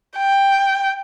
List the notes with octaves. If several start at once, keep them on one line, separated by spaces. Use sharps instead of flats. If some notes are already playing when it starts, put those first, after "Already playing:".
G5